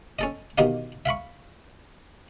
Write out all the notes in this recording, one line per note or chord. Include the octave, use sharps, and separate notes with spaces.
C#4 A4 D#5
B2 D#3 G4 D#5 F5
E5 F5 B5 C#6